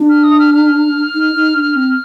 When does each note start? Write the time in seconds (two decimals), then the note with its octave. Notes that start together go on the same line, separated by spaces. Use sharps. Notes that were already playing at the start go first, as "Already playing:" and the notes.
Already playing: D4
0.09 F6
0.24 D#6
0.39 F6
0.54 F6
1.14 D#4
1.34 D#4
1.54 D4
1.75 C4